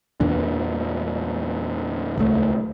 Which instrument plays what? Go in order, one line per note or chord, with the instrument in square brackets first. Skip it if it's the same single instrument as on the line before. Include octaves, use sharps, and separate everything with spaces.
[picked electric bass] E2 A#2 E3 D4
D#1 C#2 A3